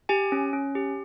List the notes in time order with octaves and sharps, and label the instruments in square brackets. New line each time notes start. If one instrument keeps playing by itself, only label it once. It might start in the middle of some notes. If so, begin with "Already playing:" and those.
[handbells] G4 G#5
C#4
C#4
G4